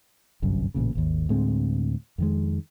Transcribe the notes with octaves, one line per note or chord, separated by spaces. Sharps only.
G1 C2 F#2
A1 A#2 C#3
G#1 D#2
D2 A2 G#3 C4
F2 D#3 G#3